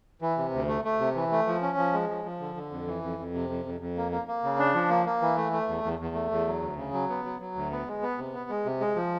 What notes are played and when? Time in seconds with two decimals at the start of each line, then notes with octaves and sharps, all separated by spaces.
0.22 E3
0.38 C3
0.53 D2
0.68 A3
0.84 A3
1.00 C3
1.15 E3
1.32 A3
1.47 F3
1.62 C#4
1.77 F3
1.93 G#3
2.09 F3
2.25 F3
2.40 D3
2.56 D3
2.72 F2
2.87 E3
3.03 F2
3.19 F2
3.34 C3
3.49 F2
3.65 F2
3.80 F2
3.97 A#3
4.12 A#3
4.28 A#3
4.43 C#3
4.59 D4
4.74 F3
4.90 A#3
5.06 A#3
5.22 E3
5.37 A3
5.52 A3
5.68 E2
5.83 E2
5.99 E2
6.14 A3
6.31 E2
6.47 F#3
6.61 D2
6.77 C#3
6.93 F#3
7.09 B3
7.25 F#3
7.40 F#3
7.56 D2
7.72 B3
7.87 G#3
8.03 B3
8.18 C3
8.34 B3
8.50 G#3
8.65 C3
8.80 G#3
8.96 F3